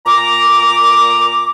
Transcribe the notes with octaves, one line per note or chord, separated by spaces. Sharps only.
A#2 A#5 D6